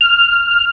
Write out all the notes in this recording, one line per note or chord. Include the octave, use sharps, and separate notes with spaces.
F6